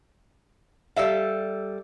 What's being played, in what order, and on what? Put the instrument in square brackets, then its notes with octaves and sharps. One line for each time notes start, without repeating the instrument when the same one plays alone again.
[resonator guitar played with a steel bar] G3 A4 E5 F5